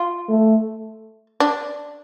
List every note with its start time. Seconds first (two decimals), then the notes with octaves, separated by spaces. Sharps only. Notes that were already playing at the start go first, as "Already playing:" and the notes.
Already playing: F4
0.29 A3
1.40 D4